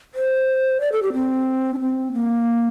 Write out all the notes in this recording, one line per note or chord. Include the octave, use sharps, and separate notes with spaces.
C5
D5
A4
G4
C4
D4
C4
A#3